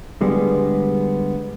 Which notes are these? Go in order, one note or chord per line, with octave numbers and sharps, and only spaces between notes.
D3 G3 G#3 B3